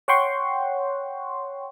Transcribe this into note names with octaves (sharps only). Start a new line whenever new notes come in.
C#5 F#5 G5 C6 C#6